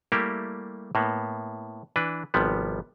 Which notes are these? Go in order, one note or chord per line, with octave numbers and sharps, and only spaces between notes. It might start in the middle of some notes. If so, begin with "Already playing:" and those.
G3 A3 A#3 E4 G4
A2 A#3 B3
E3 D4 B4
G#1 C3 F3 G3 B3